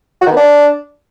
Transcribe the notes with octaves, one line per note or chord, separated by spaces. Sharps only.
F#4
D#3
B3
D4